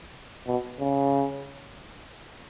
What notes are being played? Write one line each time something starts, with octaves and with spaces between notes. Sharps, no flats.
B2
C#3